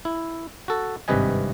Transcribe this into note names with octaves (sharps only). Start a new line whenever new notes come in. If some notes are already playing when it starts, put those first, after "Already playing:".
E4
F#4 A4
G#1 G2 C3 B4 D#5 G#5